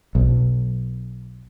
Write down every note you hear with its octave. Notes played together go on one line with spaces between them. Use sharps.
B1